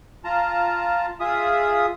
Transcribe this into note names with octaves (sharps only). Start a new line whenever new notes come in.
F4 A5 A#5
F4 G#4 E5 D#6